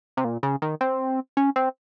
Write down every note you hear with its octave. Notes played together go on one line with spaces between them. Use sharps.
C3
A#2
C#3
D#3
C4
C#4
C4